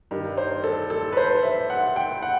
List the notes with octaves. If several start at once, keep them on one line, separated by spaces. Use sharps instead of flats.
G2 D#3
C5
A4
A4
B4
C5
E5
F#5
G5
F#5